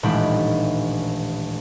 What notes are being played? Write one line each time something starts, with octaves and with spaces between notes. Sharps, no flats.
D#1 A1 G#3 D4 G4 B5